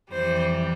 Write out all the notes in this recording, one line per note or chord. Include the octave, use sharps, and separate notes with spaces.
F2 E3 G3 C5